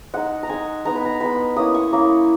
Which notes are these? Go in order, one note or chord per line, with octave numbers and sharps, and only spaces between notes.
G#3 D#4 F#5
A#5
G#3 D#4 G#5
G#3 B3 D#4 A#5
B5
A#5
G#3 B3 D#4 B5
A#3 C#4 E4 D#6
C#6
A#3 C#4 E4